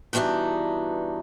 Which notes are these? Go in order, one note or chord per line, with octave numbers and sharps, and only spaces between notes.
G2 B2 E3 C4 D4 D#4